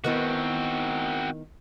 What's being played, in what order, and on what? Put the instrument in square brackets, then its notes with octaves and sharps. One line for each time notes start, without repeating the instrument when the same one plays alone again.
[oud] D#3 B3 E4 [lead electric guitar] C4 F#4